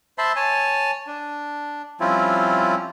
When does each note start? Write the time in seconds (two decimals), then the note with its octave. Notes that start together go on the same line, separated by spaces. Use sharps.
0.18 C5 E5 A5 B5 C6
0.36 C#5 G#5 A5
1.07 D4
2.00 F3 G3 C4 C#4 E4 F4